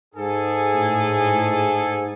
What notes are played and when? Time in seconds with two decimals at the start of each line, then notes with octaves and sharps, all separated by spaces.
0.15 G#2 G#4 A4 G#5
0.73 A2